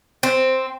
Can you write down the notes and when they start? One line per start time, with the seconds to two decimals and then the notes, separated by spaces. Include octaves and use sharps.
0.23 C4